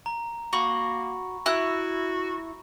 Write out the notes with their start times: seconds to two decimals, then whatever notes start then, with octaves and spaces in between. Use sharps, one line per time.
0.06 A#5
0.53 A#3 F#4 B5 C#6
1.46 E4 F#4 F#6